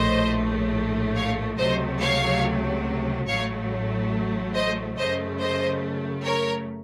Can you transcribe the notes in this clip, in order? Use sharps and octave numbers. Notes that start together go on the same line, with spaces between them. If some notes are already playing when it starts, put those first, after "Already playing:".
Already playing: A#1 A2 A3 C5 D#5
C#5 F5
C#2 C3 F#3 A3 C5 D#5
C#5 F5
A1 A2 F#3 A3 C#5 F5
C5 D#5
F#2 C#3 A3 C5 D#5
C5 D#5
A#4 C#5